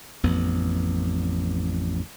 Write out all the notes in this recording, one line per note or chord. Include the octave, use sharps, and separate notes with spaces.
A1 F2 B3